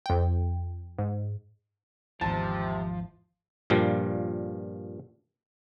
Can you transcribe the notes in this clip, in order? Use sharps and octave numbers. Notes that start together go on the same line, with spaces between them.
F2 G5
G#2
G#1 E2 C3 F3 A5
G2 A#2 F3 G3